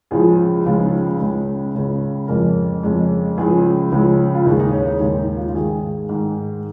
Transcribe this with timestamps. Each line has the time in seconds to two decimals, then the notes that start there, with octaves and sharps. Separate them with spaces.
0.11 C#2 C#3 F3 G#3 G#4
0.65 C#2 C#3 F3 G#3 F4
0.79 D#4
0.92 F4
1.06 G#4
1.20 C#2 C#3 G#3
1.75 C#2 C#3 G#3
2.28 F2 C#3 G#3 A#4
2.83 F2 C#3 G#3
3.38 C#2 C#3 F3 G#3 G#4
3.92 C#2 C#3 F3 G#3
4.34 F4
4.46 D#2 C#3 G#3 D#4
4.60 D#4
4.73 C#4
4.86 D#4
5.01 D#2 C#3 G#3
5.18 D#4
5.36 F4
5.48 F4
5.54 G#2 D#3 G#3 G#4
6.09 G#2 D#3 G#3